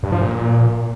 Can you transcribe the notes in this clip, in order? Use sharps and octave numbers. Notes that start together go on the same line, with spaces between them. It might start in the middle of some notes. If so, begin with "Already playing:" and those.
G2
F3
A#2